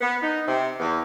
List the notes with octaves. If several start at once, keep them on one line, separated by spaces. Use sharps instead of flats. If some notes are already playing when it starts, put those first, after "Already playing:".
B3
D#4
C3
E2